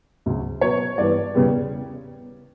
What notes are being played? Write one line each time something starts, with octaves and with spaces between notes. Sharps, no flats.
D2 C#3 F#3
B2 F#3 B3 C#5
G2 E3 B3 D5
E2 C#3 G3 B3